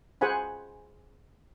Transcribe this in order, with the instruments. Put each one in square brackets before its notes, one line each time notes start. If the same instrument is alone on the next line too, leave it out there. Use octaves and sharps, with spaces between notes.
[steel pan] G#4 C5 F#5 G#5 B5